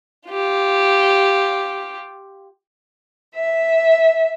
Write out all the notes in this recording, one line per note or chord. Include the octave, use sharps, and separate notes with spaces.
F4 G4
E5